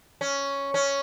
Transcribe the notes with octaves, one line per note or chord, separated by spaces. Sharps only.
C#4
C#4